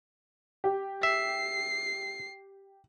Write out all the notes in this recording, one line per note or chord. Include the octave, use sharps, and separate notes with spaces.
G4
E5 C7